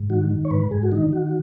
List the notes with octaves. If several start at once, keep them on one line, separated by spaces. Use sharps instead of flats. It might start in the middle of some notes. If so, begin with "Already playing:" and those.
Already playing: G#2
D#3 F#4
D#3
C#5
G#2 B4
G#2 G#4
F#4
D#3 D#4
D#3 F#4